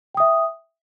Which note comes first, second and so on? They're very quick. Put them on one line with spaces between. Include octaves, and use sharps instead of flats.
G5 D#6 E5